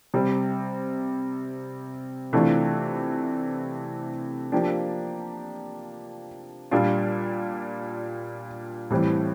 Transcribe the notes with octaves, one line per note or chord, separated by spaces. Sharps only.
C3 G3 C4
C3 E3 A3 D4 F4
F3 A#3 D4 G4
A#2 G3 D4 F4
A2 E3 G3 C4